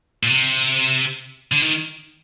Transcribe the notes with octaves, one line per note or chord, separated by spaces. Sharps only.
A#2
C3
D3
D#3